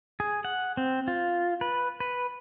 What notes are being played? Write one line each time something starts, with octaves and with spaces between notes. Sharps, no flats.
G#4
F#5
C4
F4
B4
B4